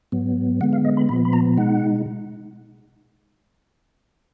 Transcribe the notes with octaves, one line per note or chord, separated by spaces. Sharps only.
G#2 F#3 B3
D3 G#3 B3 F#5
F5
D#5
B5
A#2 F3 B3 B5
B5
A#5
B2 G#3 D#4 F#5